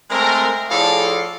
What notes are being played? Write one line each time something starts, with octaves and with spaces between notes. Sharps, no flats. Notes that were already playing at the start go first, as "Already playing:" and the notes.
G#3 A3 C4 A#4
A2 F3 G#4 A4 D5 F5